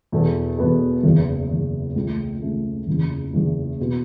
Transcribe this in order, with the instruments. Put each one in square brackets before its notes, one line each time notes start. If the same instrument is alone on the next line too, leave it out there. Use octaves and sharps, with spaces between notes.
[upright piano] E2 B2 B3 A4
E2 B2 B3 A4
F#1 E2 E3
F#1 E2 E3
C#2 C#3 A3
C#2 C#3 A3
F#1 E2 C#3
F#1 E2 C#3
B2 B3 F#4